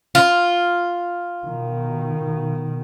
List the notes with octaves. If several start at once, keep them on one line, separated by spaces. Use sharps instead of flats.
F4
B2 D#3